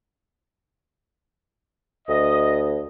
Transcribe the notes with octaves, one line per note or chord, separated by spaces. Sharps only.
D2 D#5